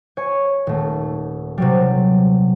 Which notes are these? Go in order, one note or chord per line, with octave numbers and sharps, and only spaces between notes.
C#5 G#5
D#1 A3
C3 F#3 G3